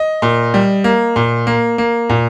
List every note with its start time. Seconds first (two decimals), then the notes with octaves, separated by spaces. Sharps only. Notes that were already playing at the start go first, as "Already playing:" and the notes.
Already playing: D#5
0.22 A#2
0.54 G3
0.84 A#3
1.16 A#2
1.47 A#3
1.78 A#3
2.10 A#2